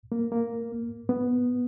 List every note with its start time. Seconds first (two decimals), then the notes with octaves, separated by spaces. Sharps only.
0.12 A#3
0.32 A#3
1.09 B3